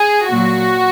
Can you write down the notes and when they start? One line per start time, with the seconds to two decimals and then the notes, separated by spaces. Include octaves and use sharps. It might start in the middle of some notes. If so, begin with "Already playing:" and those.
Already playing: G#4
0.29 A#2 F#3 F#4